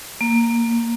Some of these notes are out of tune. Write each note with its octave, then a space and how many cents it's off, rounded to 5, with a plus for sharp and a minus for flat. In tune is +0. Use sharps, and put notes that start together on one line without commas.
A#3 -10